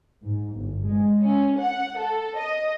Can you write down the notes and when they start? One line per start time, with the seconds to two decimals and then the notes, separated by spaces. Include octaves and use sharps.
0.23 G#2
0.55 G1
0.85 G#3
1.21 C#4
1.58 F#5
1.98 A4
2.37 D#5